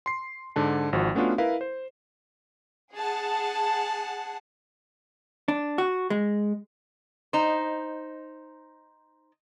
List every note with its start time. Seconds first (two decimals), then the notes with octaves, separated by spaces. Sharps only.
0.06 C6 C7
0.56 G#2 D3 A5
0.93 G#1 F3 F#4
1.15 A3 B3 C#4 D4 F4 F#4
1.38 E4 A#4 B4 F5
1.61 C5
2.95 G#4 F#5 A5
5.48 D4
5.78 F#4
6.10 G#3
7.33 D#4 C5